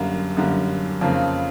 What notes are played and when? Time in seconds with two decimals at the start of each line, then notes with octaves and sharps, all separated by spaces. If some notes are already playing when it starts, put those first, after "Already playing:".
Already playing: F#2 D3 G3 A#3
0.37 F#2 D3 G3 A#3
1.01 F2 C#3 F3 A#3